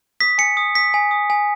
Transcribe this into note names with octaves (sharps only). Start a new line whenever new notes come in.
D#6 B6
G#5 C#7
D#6
D#6 B6
G#5
D#6
G#5